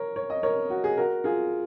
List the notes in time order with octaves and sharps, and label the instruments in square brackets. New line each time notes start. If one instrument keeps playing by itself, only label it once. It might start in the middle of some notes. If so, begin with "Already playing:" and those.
Already playing: [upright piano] A#4 C#5
C#5
D#5
A#4 C#5
F#4
G#4
F#4 A#4
F4 G#4